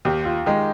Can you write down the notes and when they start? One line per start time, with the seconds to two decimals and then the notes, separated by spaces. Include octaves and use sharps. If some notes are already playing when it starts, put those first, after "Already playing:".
0.05 D#2 G4
0.25 F4
0.46 D#3 G#3 D#4